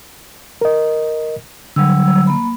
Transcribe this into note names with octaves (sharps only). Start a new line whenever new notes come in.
A#4 D#5
D3 F#3 G3 E6
A#3 B5